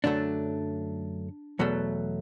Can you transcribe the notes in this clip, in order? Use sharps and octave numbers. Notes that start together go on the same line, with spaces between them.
F#2 D3 F#3 A3 D4
E2 B2 F#3 A3